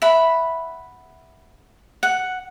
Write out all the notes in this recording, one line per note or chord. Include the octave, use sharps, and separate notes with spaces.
E5 F#5 B5
F#5